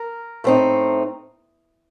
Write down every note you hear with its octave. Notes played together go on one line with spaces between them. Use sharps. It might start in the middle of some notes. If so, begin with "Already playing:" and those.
Already playing: A#4
A2 A3 C4 D#4